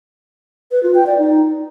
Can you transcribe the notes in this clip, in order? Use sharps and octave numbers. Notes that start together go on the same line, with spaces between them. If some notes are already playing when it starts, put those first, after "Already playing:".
B4
F4
G5
D5
D#4